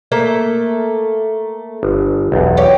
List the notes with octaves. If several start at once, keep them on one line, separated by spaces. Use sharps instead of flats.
A3 A#3 E5
G1
B1 E2
G4 C#5